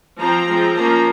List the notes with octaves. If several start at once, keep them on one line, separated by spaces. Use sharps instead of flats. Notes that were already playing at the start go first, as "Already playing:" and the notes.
F3 C4 A#5
F3 G#3 C4
F3 A#3 C#4 A#5